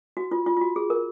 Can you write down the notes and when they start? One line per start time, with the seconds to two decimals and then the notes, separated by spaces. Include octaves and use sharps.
0.17 F#4
0.31 F4
0.46 F4
0.57 F4
0.61 F#4
0.76 G#4
0.90 A#4